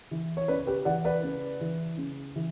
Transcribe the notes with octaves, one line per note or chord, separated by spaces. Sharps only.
E3
C#5
C#3 B4 D5
G4 B4
E3 D5 F#5
B4 D5
C#3
E3
C#3
E3